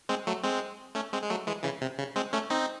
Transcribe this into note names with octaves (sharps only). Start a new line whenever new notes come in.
G#3 C4
F#3 A3
G#3 C4
A3 C#4
G#3 C4
G#3
F#3 A3
E3 G#3
C#3 E3
C3
C#3
G#3 C4
A3 C#4
C4 D#4